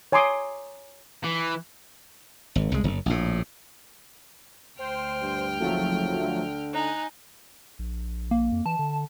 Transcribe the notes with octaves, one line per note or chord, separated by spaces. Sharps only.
C#5 G#5 A#5 C6 D6 D#6
E3
G#1
C2 G#3
F#1
A#1 A2
D2 C5 G5 F6
G2
F#1 F3 F#3 A3
D3
D#4 G#5 F#6
A#1
A#3
F2
E3 A5
D3